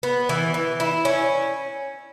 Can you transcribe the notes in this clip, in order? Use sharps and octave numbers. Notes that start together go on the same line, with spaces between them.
B3
E3
E3
E4
C#4